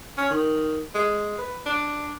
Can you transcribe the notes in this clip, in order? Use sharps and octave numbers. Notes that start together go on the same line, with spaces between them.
C#4
D#3
G#3
B4
D4